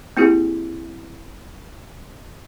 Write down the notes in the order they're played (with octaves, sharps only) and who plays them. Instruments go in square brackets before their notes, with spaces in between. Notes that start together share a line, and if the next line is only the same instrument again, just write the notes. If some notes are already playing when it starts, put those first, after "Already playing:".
[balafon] A#3 C4 E4 F4 G4 G#4